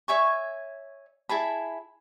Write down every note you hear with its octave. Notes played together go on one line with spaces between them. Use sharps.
C#5 E5 G#5 C#6
E4 G#4 A5 B5